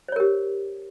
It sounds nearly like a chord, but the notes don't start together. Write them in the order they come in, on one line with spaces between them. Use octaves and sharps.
C5 C#5 A#4 G4